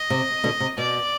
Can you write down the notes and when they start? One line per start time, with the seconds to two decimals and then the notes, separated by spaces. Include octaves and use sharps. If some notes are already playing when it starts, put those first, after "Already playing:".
Already playing: D#5
0.10 C3
0.44 B2 D3
0.60 C3
0.78 B2 D5